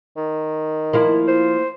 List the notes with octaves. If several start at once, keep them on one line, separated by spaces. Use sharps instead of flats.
D#3
F3 A#3 E4
C5